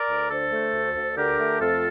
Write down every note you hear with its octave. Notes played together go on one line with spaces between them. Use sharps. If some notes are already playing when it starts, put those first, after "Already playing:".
Already playing: A#4 D5
D2
D3 A4 C5
A3
D2
D2
D3 G4 A#4
A3
F2 F4 A4